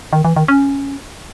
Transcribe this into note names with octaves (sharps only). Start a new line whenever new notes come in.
D#3
E3
D#3
C#4